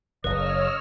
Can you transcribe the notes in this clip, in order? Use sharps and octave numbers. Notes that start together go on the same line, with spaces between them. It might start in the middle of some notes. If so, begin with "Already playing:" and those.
F#1 C#3 B4 C#5 D#5 E6 F6